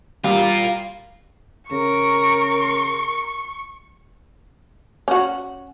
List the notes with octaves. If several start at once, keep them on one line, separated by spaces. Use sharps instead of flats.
G3 F4 A#4
C#3 A#4 C#6
C#4 F#4